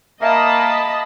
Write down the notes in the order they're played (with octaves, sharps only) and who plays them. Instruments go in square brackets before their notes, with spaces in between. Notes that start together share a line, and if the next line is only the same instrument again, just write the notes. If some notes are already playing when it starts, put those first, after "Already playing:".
[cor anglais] A#3 [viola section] D#5 B5 [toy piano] E5 [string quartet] A5